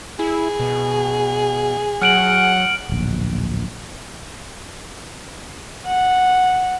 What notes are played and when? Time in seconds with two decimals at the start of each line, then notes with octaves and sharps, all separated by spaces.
0.19 E4 G#4
0.60 B2
2.02 F#3 F#5 F6 D7 F#7
2.89 D1 A#1
5.86 F#5